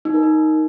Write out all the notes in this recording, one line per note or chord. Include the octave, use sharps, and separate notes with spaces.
D#4
A#4
D#4